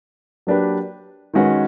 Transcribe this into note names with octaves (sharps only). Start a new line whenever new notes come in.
F#3 A#3 D4 G4 B4
D#3 G#3 C#4 F#4 B4